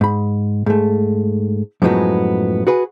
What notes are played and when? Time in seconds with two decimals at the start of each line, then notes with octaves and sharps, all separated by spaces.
0.01 G#2 B5
0.66 G#2 A3
1.82 F#2 A2 F3 F#3 G#3 B3
2.67 F#4 G#4 B4